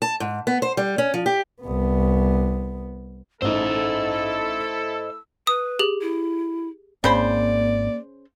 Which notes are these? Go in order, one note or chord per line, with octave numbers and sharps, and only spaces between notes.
A5
G#2
B3
C5
G3
C#4
F3
G4
C2 B3
A1 A3 D#4 E4 A4 C5 D#5 E6
B4 D#6
G4 G#4 F#7
E4
G#1 G#2 C#3 A#3 C4 C5 D5 B5